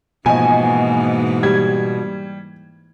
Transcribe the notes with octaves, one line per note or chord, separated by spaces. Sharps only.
G#2 B2 E3 F3 A#3 D#5 G#5
G3 G#6